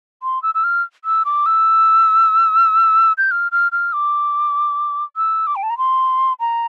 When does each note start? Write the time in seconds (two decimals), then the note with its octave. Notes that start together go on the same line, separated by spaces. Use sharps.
0.23 C6
0.43 E6
0.55 E6
0.64 F6
1.05 E6
1.25 D6
1.46 E6
3.18 G6
3.31 F6
3.52 F6
3.72 F6
3.93 D6
5.16 E6
5.47 D6
5.56 G5
5.63 A5
5.70 A#5
5.78 C6
6.40 A#5